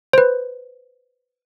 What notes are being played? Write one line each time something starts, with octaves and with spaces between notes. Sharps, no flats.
B4 C5